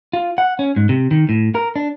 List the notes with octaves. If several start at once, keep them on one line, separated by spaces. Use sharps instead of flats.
F4
F#5
C#4
G#2
C3
D#3
A2
A#4
D4